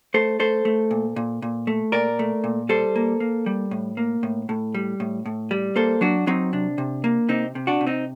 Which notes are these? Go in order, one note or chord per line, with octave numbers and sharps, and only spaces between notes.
A3 A4 C5
A3 A4 C5
A3
A#2
A#2
A#2
A3
A#2 A#4 D5
A3
A#2
G3 A4 C5
A#3
A#3
G3
A2
A#3
A2
A2
G3
A2
A2
G3
A#3 A4 C5
F#3 D4 F#4
F#3 C4 D#4
C3 D4
C3
A#3
C3 C4 D#4
C3
D4 F#4
C3
C4 D#4